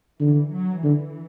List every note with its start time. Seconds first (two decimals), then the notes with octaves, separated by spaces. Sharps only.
0.20 D3 E3
0.52 F#3
0.83 D3 E3